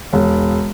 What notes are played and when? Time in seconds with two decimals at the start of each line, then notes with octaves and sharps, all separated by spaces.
0.13 E1